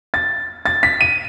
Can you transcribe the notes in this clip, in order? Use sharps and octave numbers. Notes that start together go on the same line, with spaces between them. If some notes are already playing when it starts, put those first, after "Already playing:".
A6
A6
B6
D#7